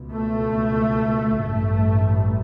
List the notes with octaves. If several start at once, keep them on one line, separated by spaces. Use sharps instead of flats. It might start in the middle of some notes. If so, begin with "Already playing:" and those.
Already playing: C#2 B2
A3
A1 G2 A3